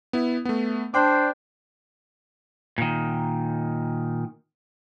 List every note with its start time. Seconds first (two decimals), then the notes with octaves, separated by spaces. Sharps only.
0.13 B3 E4
0.45 A3 B3
0.94 D4 C5 G5 D6
2.78 A#2 D#3